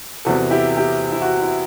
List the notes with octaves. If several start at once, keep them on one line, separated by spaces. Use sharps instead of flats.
E2 C3 E3 F#4 A4
E4 G4
E4 G4
E4
F#4
E4